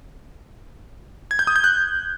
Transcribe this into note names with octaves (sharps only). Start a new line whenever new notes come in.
G#6
G6
D#6
G6
F#6